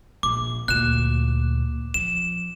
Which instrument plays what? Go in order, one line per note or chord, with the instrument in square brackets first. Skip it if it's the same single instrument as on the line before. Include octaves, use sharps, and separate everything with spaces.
[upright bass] A#1 [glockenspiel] D6
[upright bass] D2 A#2 [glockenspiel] F#6 E7
[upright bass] F3 [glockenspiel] E7